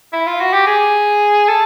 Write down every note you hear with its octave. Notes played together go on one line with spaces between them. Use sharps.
E4
F4
F#4
G4
G#4
A4